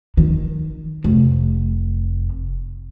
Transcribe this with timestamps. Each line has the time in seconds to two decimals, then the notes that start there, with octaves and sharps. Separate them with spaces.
0.17 D#3
1.04 F1